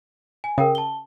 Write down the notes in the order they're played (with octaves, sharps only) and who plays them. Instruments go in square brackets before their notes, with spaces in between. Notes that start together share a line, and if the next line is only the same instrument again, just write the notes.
[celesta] G#5
[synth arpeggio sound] C#3 [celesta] A#4 G5 D#6
[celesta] A5 G7